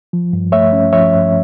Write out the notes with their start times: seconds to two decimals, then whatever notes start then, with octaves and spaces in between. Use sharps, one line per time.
0.13 F3
0.33 G2
0.52 A3 C#5 E5
0.73 C#4
0.93 F3 C#5 E5
1.14 G2